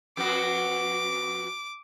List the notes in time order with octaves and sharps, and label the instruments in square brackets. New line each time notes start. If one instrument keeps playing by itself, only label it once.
[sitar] F2 B3 F#4 [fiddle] D6